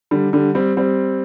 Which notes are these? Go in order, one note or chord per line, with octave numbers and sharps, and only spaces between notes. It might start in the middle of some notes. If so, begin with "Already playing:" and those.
D3 G3
D3 G3
G3 C4
G3 C4